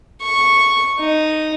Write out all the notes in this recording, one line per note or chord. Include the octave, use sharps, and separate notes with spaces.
C#6
D#4